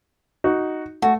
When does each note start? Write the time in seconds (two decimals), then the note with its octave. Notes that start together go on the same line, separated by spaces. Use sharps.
0.44 D#4 F#4
1.02 A3 F#4